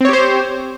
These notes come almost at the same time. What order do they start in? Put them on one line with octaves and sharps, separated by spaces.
C4 C#5 G4 C5